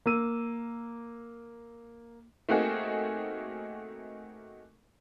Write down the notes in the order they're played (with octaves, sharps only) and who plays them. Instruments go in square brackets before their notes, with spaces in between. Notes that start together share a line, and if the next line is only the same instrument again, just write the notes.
[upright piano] A#3 E6 D#7
[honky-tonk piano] A3 A#3 C4 D#4 F#4 G#4